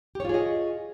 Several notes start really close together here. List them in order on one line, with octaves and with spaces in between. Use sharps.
G4 C#5 F4 G#4 D#5